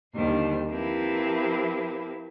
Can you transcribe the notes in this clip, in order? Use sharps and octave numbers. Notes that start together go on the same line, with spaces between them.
D#2 D3 D#3 G3 C5 C6
F3 C4 E4 G4 A#4 B4